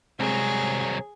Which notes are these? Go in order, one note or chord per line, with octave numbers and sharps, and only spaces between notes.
C2 C3 F#3 G#3 C4 G#4